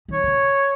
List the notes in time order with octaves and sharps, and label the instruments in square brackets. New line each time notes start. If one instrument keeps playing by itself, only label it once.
[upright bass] D#3 [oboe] C#5
[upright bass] C#3